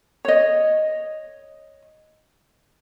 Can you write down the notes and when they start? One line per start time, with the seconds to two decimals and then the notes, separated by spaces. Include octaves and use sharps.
0.25 C#5 D#5